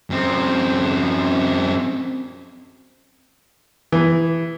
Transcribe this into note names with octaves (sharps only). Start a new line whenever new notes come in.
F#2 C4
E3